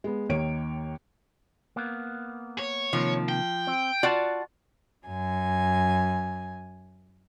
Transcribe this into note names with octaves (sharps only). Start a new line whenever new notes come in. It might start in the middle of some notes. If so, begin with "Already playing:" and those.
G#3 B3
D#2 D#3 A#3 C#5 D7
A#3 B3
C#5
C3 D#3 F3 A#3
G5
C4
F4 F#4 D5 F#5 A5
F#2 G#5